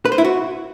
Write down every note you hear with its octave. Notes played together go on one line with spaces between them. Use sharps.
B4
C5
E4
F#4